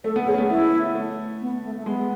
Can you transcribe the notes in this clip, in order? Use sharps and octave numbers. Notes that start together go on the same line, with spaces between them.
A3 A4
B3
C#4 G#4
A3
B3
A3 E4
A3
B3
A3
A3
G#3 B3